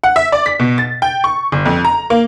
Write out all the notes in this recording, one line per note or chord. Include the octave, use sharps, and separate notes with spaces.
F#5
E5
D5
B6
B2
A6
G5
C#6
G1
F2
A#5
A#3